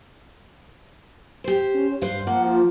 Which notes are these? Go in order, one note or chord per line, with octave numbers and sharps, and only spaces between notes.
G4 C5
C#4
G2 B4 C5 F5
F3 A#3 F#5
F4